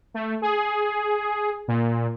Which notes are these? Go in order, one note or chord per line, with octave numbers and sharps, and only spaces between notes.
A3
G#4
A#2